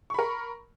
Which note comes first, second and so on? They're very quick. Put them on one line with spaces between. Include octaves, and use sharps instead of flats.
C#6 B5 A#4